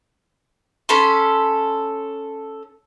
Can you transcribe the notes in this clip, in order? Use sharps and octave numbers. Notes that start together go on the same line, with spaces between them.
C#4 A4 B5 C6